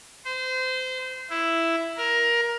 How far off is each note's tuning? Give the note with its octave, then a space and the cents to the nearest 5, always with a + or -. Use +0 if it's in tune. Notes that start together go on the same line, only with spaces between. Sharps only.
C5 -25
E4 +5
A#4 +15